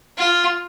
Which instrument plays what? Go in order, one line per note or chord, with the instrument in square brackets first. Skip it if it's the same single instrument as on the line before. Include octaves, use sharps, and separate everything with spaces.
[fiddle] F4